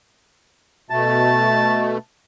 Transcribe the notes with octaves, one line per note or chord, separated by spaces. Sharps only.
B2 A3 A5